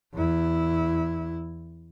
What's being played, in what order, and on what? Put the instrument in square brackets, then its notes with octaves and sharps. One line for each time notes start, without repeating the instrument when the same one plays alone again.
[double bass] E2 E4